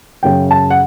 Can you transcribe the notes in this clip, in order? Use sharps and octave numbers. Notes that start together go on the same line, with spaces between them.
F#2 C#3 F#3 G5
A5
F#5